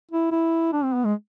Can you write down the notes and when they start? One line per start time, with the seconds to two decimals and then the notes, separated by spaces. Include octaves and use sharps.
0.11 E4
0.31 E4
0.73 D4
0.84 C4
0.94 B3
1.05 G#3